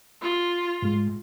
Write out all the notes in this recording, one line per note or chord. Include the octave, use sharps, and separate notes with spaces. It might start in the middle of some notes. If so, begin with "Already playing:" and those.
F4
G#2 G#3